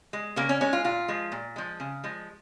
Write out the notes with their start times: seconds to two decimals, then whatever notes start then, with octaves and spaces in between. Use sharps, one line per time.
0.13 G#3
0.36 C#3 A#3
0.49 C#4
0.61 G#3 C#4
0.73 F4
0.84 A#2 F4
1.08 F3 G#3
1.32 A#2
1.56 F3 G#3
1.80 C#3
2.04 F3 G#3